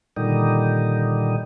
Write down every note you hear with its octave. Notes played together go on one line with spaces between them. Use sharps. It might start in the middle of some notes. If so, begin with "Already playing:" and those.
A#2 D3 D#3 G3 D#4